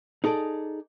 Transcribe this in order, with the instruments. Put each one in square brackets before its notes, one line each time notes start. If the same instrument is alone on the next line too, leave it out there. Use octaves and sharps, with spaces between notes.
[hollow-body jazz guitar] D#4 G#4 A4 C#5 D5